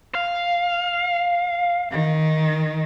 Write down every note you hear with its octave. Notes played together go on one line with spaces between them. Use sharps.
F5
D#3